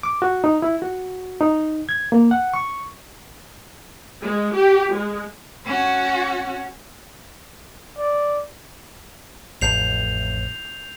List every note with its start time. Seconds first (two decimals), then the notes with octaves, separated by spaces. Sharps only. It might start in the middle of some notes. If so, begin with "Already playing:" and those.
0.03 D6
0.22 F#4
0.44 D#4
0.62 E4
0.82 F#4
1.41 D#4
1.89 G#6
2.12 A#3
2.31 F#5
2.54 C#6
4.21 G#3
4.53 G4
4.91 G#3
5.66 C#4 F#4
7.98 D5
9.61 A1 F2 A2 G6 C7 F7